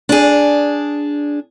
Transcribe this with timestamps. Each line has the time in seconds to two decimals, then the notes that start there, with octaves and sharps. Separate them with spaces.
0.09 D4 G#4